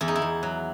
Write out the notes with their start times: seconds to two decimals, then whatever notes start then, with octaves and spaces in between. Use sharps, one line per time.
0.01 E2 E4
0.08 D#4
0.16 E4
0.22 E2
0.43 F#3